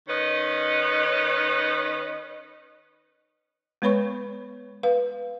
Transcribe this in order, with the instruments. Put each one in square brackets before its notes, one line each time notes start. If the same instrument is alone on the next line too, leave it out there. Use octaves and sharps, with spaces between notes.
[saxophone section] D#3 C#4 B4 D#5
[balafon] G#3 B3 B4 C#5 B5 C#6
B4 F5